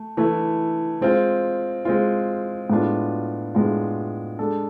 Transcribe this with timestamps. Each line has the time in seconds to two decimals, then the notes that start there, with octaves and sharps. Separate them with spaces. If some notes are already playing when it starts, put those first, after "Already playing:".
Already playing: A3
0.17 E3 A3 E4
1.01 G#3 C4 F4
1.85 G#3 C4 F4
2.70 A2 G#3 B3 D4 F4
3.55 A2 G#3 B3 D4 F4
4.39 G#3 D4 A4